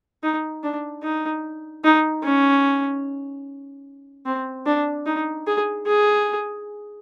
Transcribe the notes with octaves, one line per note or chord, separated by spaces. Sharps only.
D#4
D4
D#4
D#4
C#4
C4
D4
D#4
G#4
G#4